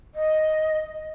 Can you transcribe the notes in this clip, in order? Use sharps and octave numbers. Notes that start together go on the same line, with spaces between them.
D#5